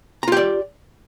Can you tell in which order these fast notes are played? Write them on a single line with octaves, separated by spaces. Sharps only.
A#5 F4 G4 D5